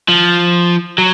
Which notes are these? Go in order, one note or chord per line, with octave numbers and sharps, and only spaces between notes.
F3
F#3